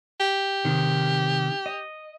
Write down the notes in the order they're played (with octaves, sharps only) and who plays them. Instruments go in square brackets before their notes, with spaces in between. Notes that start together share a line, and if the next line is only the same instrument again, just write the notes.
[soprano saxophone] G4
[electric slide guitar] C3 D#3
D#5